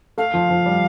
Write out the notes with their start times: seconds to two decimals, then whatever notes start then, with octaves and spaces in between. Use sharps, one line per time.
0.18 A3 F5
0.34 F3
0.50 F3
0.66 G3